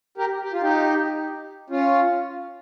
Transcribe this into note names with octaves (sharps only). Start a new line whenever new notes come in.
G4 A#4
G4
F4
D#4 G4
C#4 F4